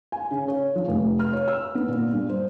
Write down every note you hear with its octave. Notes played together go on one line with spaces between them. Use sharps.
G#5
C#3
C#5
F3
F1
F6
C#5
E6
B3
A#2
G2
C5